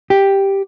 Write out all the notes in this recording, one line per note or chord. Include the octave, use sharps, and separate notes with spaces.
G4